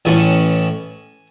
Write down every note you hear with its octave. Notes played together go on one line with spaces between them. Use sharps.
A1 A2 E3 A3 C#4 G#5